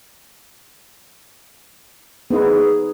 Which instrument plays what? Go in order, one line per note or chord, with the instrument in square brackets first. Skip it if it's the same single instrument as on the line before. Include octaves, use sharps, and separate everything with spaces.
[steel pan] B3 D#4 B4 [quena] G#4